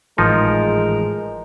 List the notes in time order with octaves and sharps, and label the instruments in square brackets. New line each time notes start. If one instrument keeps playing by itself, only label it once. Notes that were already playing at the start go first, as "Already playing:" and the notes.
[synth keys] G#1 A2 E3 [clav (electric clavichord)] F3 D#4 [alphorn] G#3 [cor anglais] A#4